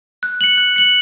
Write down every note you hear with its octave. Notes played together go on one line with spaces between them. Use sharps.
F#6
C#7 F#7
F#6
C#7 F#7